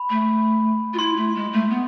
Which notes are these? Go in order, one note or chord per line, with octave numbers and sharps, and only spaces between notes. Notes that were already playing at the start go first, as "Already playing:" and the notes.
Already playing: B5
A3
F4
E4 C6
A3
G#3
A3
B3